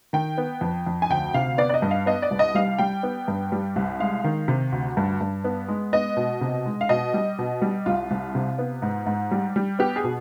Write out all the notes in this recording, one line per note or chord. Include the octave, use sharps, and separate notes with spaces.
D#3 G5
B3
F2
F2
G#5
D2 G5
C3 F5
B3 D5
D5
D#5
G2
F5
B3 D#5
D5
C2
D#5
G3 F5
G3 G5
B3
G2
G3
C2
G#3 F5
D#3
C3
D2
G2
G2
B3
G#3
B3 D#5
B2
C3
G#3
F5
B2 D#5
G3
B2
G3
C2 F4
C2
C3
B3
G#2
G#2
G3
G3
B3 G4
G#4
B2